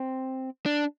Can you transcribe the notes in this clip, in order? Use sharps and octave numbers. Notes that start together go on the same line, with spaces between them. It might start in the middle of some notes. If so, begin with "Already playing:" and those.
Already playing: C4
D4